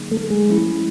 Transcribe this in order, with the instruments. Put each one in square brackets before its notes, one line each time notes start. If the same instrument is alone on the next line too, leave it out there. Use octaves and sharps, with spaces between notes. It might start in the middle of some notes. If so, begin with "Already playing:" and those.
Already playing: [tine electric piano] D3 F#3 A#3 D#4 G#4
[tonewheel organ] A3
G#3
[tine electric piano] F3 A3 C#4 E4